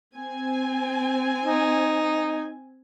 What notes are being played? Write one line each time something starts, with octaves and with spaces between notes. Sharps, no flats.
C4 G#5
D#4